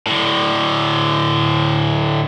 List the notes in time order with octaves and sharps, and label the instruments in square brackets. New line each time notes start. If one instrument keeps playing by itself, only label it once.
[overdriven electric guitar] A2 D3